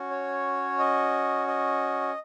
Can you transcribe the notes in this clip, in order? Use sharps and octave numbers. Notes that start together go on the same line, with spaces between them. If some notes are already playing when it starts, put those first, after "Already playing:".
Already playing: C#4 F#4
C#5
D#5
D#5